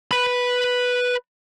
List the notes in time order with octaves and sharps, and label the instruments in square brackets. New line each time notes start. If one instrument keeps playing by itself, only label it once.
[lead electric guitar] B4 B5